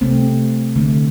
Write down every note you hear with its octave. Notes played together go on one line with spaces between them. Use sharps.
C3 A3 C4
D3 A3